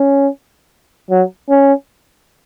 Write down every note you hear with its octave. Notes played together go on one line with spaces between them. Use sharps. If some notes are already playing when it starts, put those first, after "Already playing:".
Already playing: C#4
F#3
C#4